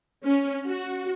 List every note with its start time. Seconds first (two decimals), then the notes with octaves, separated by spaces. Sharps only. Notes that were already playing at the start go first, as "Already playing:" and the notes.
0.24 C#4
0.66 F#4